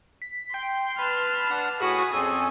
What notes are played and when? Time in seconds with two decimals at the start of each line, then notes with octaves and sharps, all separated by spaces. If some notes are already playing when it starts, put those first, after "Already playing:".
0.22 B6
0.54 G5 C6
0.99 B4 A5 F6
1.50 D4 F#5
1.80 A2 F#4 G#4 B4 D#6
2.13 F2 C4 C#4 A4 G#5 D#6